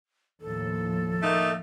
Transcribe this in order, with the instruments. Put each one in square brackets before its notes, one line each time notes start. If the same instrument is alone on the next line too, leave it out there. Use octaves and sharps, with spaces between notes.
[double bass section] D#2 A2 F3 [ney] A4
[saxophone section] A3 A#3 D#4